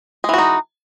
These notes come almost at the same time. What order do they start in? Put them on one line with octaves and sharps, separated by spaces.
G#3 E3 F#4 D#4